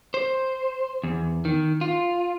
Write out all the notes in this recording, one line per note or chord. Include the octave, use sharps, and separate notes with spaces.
C5
E2
D#3
F4